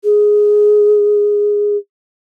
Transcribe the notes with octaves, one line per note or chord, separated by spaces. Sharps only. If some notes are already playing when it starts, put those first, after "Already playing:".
G#4